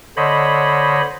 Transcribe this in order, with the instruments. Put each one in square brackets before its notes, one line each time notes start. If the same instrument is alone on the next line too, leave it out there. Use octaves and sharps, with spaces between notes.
[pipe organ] D3 C5 C#5 D#5 B5